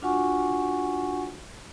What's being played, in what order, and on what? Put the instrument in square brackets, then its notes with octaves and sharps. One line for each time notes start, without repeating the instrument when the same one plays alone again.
[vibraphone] D4 F4 F#4 F#5 G#5 C#6